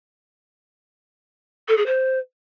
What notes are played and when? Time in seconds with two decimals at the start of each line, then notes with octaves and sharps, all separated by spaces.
1.68 A4
1.77 G#4
1.86 C5